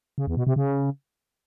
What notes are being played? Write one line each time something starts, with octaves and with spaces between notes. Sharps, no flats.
C#3
E2
B2
C3
C#3